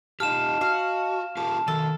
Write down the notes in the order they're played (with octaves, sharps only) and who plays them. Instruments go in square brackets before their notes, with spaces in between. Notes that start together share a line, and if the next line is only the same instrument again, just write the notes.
[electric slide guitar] D#4 F4 G4 [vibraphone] D#5 A5 [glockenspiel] F6 E7
[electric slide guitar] F#4 [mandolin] F5
[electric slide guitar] F4 G4 A#4 [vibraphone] A5
[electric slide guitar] D#3 F#3 [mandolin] A4